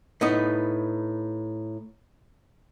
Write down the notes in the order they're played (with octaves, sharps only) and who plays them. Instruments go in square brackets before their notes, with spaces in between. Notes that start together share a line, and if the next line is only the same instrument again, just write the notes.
[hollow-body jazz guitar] A2 B3 D#4